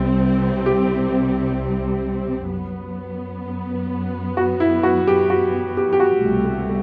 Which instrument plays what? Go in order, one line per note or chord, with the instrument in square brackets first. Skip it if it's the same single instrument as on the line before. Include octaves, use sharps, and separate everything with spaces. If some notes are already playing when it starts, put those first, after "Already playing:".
Already playing: [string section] C2 C3 G3 C4
[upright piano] G4
[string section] F#2 F#3 B3
[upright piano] F#4
E4
F#4
G4
F#4
G4
G4
F#4
[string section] C2 B2 A3